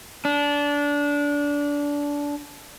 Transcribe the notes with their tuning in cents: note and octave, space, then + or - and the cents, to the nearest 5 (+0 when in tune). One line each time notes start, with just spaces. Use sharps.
D4 -20